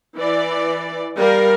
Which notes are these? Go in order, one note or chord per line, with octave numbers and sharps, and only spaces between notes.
E3 D5
G3 A#4 F5